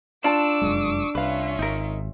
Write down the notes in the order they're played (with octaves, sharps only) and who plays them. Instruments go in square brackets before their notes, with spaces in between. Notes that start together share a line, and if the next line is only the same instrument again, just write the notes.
[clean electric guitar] D4 [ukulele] F4 A5 [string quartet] C#6 D6 E6
[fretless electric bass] F1 F#2 G#3
[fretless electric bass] C2 [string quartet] C#4 F4 E5 [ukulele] B4 F5
[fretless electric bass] G#1 [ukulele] D#4 A#4